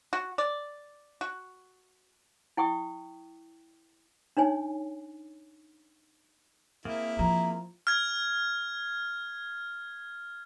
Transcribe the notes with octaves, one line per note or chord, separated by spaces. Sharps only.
F#4
D5
F#4
E4 G5 C#6 D#6
D4 D#4 C#5 G#5
A#3 C4 E4 G#4 A#4
F3 A#5
F6 G#6